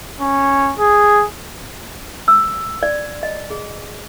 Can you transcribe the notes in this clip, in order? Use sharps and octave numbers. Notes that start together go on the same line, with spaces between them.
C#4
G#4
E6
D5
D#5
G#4